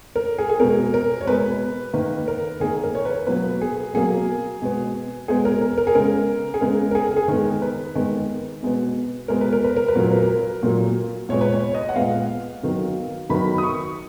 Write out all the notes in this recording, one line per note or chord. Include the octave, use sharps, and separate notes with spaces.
A#4
G#4
G#4
B2 G#3 B3 A#4
A#4
C#5
B2 G#3 B3 B4
D#3 A#3 B4
A#4
D#3 A#3 G#4
A#4
C#5
B4
B2 F#3 A#3 B4
G#4
B2 F#3 A#3 G#4
B2 G#3 B3
B2 G#3 B3 G#4
A#4
A#4
A#4
G#4
C#3 G#3 B3 A#4
G#4
C#3 G#3 B3 A#4
A#4
G#4
G#4
D#3 G#3 B3 A#4
B4
D#3 G#3 B3
B2 G#3 B3
B2 G#3 B3 A#4
B4
A#4
B4
A#4
B4
A#2 F#3 A#3 A#4
B4
A#4
A#2 F#3 A#3
A#2 G#3 B3 C#5
B4
C#5
D#5
F#5
A#2 G#3 B3 F5
D#3 F#3 B3
D#3 F#3 B3 B5
D#6
C#6